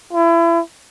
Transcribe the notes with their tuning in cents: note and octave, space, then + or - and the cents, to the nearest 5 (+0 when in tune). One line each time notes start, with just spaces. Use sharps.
E4 +30